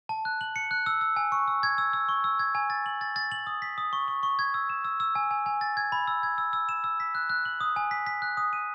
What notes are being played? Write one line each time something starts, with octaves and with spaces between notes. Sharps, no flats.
A5
F#6
F#7
C#7
F#6
E6
E6
G#5
C#6
E6
G#6
E6
E6
C#6
E6
G#6
G#5
A6
F#7
A6
A6
F#7
D#6
B6
D#6
C#6
C#6
C#6
G#6
E6
E7
E6
E6
G#5
G#5
G#5
A6
G#6
B5
E6
G#6
E6
E6
E7
E6
B6
F#6
F#6
F#7
D#6
G#5
B6
B6
F#6
D#6
D#7